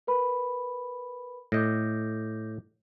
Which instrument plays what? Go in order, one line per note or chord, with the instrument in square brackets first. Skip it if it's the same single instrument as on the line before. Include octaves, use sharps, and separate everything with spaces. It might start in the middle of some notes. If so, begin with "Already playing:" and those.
[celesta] A#4 B4 B5
[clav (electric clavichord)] A2 D#5 [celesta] D6 G6 A#6